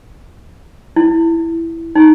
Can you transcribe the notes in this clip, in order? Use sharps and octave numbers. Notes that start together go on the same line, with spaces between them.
E4
D#4